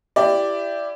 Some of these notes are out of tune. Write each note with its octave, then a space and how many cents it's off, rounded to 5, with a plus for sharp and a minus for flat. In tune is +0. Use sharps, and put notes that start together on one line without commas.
E4 +20 G4 +0 D5 +0